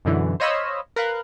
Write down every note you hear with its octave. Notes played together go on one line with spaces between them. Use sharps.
F#2 B2 D3 E3
C5 C#5 D#5 F5 B5 E6
A#4 B4 F5 F#6